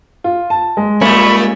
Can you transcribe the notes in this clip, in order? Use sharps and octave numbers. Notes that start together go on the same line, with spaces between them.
F4
A5
G#3
A#2 G3 A3 A#3 C#4 B5 C#6